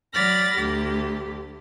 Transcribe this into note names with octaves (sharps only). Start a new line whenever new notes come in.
F#3 D5 B5 F6 A6 A#6
D2 G4